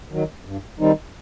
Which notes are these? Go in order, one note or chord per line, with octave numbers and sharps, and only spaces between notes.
D#3 F#3
G2
D#3 G3 C4 D#4